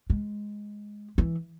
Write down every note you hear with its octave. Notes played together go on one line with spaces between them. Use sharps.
G#3
E3